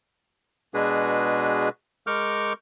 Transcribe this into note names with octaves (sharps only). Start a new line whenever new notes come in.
B2 G#3 D4 F#4 G#4 B4
G#3 A#4 C#6 D6 F6 G6